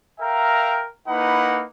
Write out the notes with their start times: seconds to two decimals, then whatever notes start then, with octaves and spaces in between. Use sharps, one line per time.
0.20 A#4 E5 F5 G5 A#5
1.08 A#3 D#4 E4 B4 F#5